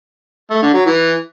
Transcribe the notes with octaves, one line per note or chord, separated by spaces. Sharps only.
A3
D3
F#3
E3